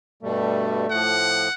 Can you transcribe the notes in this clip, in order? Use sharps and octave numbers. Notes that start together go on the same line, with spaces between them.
G2 B2 G3 A3
A2 F3 F#5